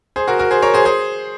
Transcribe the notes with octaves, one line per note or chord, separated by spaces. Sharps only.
G#4 C5
F#4 A#4
F#4 A#4
G#4 C5
A#4 C#5
G#4 C5
G#4 C5